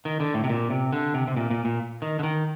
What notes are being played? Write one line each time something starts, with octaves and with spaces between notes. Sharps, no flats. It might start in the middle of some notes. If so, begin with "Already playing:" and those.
D#3
D3
A2
C3
A#2
C3
D3
C3
C3
A#2
A#2
A#2
D#3
D3
D#3